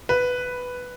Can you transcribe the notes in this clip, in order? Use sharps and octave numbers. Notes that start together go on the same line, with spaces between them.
B4